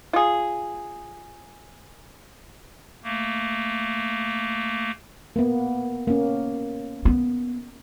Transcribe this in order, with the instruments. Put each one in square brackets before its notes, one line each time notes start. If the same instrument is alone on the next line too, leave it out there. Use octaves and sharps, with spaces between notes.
[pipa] F4 G#4
[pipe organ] A3 A#3
[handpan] A#3 B3
A#3 C#4
[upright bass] B3